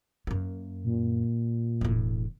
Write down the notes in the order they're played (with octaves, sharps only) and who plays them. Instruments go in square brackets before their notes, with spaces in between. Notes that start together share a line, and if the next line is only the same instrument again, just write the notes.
[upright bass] F#2 A#3
[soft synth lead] A#2
[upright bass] E1 A2